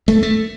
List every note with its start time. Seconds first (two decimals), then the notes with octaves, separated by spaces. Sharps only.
0.08 A3
0.23 A3